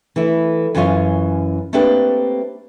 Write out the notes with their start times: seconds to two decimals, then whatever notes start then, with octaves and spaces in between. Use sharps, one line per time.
0.16 E3 A3 E4
0.75 F#2 E3 C#4 F4 C#5 G#5
1.73 A3 A#3 C4 D4 G4 B4